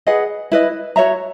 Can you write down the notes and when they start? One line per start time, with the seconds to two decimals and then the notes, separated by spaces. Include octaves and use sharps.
0.07 G#4 B4 D#5 F#5
0.52 E4 B4 D#5
0.96 F#4 C#5 E5 A#5